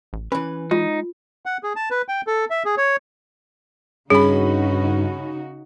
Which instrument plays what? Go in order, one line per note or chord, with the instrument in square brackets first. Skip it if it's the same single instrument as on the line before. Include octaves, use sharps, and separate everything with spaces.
[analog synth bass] A1
[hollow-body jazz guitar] E3 B4 [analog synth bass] C#4
[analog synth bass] G#3 [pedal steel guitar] D#4 [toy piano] F4
[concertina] F#5
G#4
A5
B4
G5
A4
E5
G#4
C#5
[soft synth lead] G2 [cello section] C#3 D#4 F#4 [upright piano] C#4 B5 [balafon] G#4